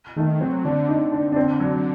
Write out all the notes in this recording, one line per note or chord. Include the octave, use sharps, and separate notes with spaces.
D#3 A3
F#3 C4
D3 D4
D#4
D4
D4
C4
F#3